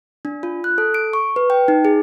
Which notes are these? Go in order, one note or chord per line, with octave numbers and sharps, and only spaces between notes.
D4
F4
F#6
A4
D7
C#6
B4
G5
D#4
G#4